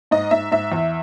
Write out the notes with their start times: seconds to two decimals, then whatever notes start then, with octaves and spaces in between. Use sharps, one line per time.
0.11 G#2 D#5
0.31 G#2 E5
0.52 G#2 E5
0.72 E2